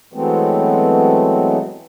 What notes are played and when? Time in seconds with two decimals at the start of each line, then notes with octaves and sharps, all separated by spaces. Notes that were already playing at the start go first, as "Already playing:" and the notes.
0.13 E3 F#3 G#3 A3 B3 C4